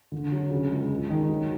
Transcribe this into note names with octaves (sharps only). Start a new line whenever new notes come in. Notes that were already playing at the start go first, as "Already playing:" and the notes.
D3
F#3
C#3
C#2
C#2
D#3
F#3